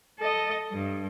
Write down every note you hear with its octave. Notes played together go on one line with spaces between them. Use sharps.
A4 D#5
G2